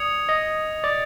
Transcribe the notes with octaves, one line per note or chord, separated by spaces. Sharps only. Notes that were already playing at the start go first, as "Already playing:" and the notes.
Already playing: D5 D#6 G#6 C#7 F7
D#5
D5